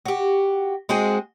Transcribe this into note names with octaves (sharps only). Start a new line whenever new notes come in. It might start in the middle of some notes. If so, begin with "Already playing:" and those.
F#4 G4
G#3 C4 F#4 G#4